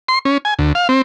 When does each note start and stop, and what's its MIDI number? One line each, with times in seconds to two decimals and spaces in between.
0.08 0.19 84
0.25 0.38 61
0.45 0.54 80
0.59 0.73 38
0.75 0.88 77
0.89 1.02 60